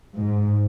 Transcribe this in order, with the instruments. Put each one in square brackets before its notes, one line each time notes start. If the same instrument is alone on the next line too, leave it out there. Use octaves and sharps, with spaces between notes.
[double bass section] G#2